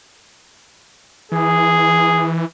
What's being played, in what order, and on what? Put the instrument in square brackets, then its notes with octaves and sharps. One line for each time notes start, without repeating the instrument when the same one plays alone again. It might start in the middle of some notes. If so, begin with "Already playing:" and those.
[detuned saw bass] E3 [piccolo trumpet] G#4